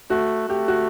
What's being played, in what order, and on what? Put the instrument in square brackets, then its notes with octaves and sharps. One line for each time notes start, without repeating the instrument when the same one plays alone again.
[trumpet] A3 [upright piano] F#4
[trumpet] A3 [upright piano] G4
[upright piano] F#4